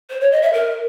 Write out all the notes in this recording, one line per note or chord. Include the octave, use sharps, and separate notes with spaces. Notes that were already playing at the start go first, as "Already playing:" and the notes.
C5
C#5
D#5
E5
A#4